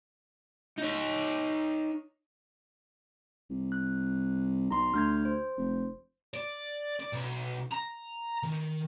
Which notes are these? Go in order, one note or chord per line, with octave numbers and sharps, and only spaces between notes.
D#4 C#5
C2
F#6
B1 A#5 C6
D2 F6 G6 G#6
C5
F1
D5
D5
B1
A#5
D#3